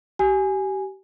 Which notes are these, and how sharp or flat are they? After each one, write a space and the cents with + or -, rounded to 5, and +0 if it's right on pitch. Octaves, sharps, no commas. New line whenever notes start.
G4 -30 G#5 +0